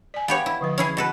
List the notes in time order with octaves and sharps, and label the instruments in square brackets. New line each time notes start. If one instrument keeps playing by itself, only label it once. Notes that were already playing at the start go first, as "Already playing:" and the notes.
[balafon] D5 G#5
[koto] B3 G4 C#5 [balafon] F5
[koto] E4
[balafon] D3 F3 B4
[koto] C#4 E4 G#4
B2 A4 B4